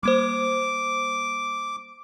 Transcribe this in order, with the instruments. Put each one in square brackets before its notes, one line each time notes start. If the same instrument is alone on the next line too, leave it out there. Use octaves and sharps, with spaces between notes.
[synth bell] G3 A#3 C5 [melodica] D6